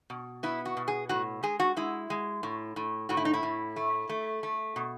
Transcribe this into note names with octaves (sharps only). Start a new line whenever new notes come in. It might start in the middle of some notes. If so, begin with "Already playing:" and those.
B2
B3 E4
F#4
B2
G#4
A2 F#4
G#3 G#4
F#4
G#3 E4
G#3
A2
A2
A2 F#4
E4
D#4
E4
A2
A3
A3
A3
B2